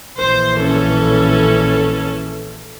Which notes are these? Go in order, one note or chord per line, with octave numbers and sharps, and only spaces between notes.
A#1 E3 C5
C#4 A4